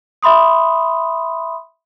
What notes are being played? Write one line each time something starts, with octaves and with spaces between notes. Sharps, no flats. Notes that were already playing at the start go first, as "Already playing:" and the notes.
E5 B5 C6 D#6